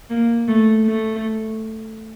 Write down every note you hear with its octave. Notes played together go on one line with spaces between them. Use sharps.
A#3
A3
A3